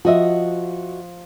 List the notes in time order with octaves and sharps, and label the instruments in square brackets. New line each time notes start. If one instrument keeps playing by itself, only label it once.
[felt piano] F3 [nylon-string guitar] F#4 D#5 E5